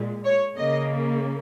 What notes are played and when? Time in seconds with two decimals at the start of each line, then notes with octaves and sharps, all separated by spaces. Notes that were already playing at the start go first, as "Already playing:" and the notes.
Already playing: A#2 G#3
0.25 C#5
0.57 C#3 A#3 D#5